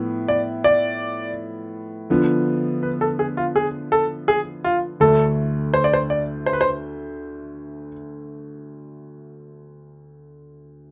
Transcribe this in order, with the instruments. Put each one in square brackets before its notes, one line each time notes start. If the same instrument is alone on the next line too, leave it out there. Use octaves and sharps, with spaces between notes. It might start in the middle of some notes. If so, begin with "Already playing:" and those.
Already playing: [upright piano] A2 F3 B3 E4
[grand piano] D5
D5
[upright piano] D3 F3 B3
[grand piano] B4
A4
G#4
F4
G#4
A4
G#4
F4
[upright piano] D2 D3 A3 [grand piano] A4
[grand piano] C5
D5
C5
D5
C5
B4
C5